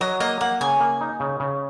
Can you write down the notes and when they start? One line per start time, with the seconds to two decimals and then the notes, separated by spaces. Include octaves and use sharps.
0.01 F#3 D#5
0.20 A#3 D#5
0.41 A#3 F#5
0.61 C#3 G#5
0.80 A#3
1.01 D#4
1.20 C#3
1.40 C#3